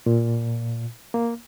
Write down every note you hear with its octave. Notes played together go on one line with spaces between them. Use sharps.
A#2
A#3